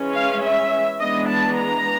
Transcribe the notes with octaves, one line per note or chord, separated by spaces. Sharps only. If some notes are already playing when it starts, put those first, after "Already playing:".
Already playing: E3 G#3 C#4
F5
E5
E3 G#3 B3 D4 D#5
A5
A#5